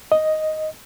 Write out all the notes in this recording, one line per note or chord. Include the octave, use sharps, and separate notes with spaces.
D#5